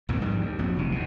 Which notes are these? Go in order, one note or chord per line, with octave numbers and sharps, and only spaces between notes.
A#1 F2 G#2 D#3
G#2 F3 G3
D#2
A#1 F2 F#3
F1 C3 E3
D#2 B2